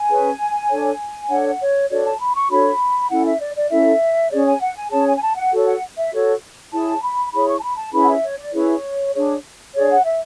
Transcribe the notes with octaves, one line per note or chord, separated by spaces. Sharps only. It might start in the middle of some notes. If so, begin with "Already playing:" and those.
Already playing: G#5
C#4 G#4 B4
D4 A4 C#5
D4 A4 C#5 F#5
C#5
D4 F#4 A4 C#5 D5
A5
B5
C#6
D4 F#4 A4 C#5 B5
C#4 E4 A4 F#5
E5
D5
D5
C#4 E4 A4 E5
C#4 G#4 C#5 D5
G#5
F#5
G#5
C#4 G#4 C#5 A5
G#5
G#5
A5
F#5
F#4 A4 C#5
F#5
E5
F#4 A4 C#5
E4 G#4 C#5 A5
B5
E4 G#4 C#5 B5
C#6
A5
B5
A5
C#4 E4 G#4 B4 B5
F#5
E5
C#5
D5
C#4 E4 G#4 B4 C#5
D4 G#4 C#5
D4 G#4 C#5 D5
F#5
E5